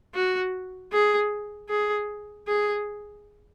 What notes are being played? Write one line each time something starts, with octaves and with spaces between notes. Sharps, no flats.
F#4
G#4
G#4
G#4